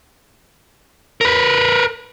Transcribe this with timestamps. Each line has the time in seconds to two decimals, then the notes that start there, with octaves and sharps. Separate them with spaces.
1.21 A#4 B4